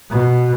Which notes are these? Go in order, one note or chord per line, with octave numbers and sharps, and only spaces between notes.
B2